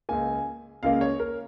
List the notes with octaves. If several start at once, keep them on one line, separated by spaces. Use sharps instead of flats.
C#2 C#3 A#3 G#5
C#2 C#3 A#3 F5
C#5
A#4